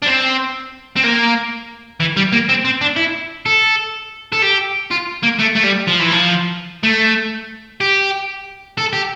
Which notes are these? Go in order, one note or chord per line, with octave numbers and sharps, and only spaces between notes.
D4
C4
C4
A#3
E3
G3
A#3
C4
C4
D4
E4
A4
A4
G4
F4
A#3
A3
A3
G3
F3
E3
F3
A3
G4
A4
G4